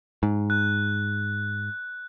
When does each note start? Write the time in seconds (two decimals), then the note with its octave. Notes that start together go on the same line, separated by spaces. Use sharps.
0.23 G#2
0.50 F#6